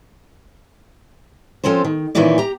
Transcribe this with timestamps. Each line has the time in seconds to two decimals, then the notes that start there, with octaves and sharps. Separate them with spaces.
1.64 F3 C4 C#4 A4 C5
1.85 D#3
2.15 A#2 D#3 E3 C#4 E4 D5
2.38 G4 A#5